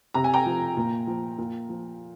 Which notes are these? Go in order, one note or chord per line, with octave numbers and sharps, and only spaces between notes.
C3 A#5
G#5
G5 A#5
F3
A#2
F3
A#2
F3